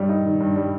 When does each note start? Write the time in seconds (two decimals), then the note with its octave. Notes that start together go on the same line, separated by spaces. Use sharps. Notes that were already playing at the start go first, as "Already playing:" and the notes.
Already playing: G2 G3
0.09 D#4
0.25 D#3
0.40 G2
0.56 G3